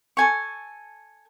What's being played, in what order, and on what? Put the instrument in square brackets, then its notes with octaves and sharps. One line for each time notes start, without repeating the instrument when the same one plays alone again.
[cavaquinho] A4 G#5 C#6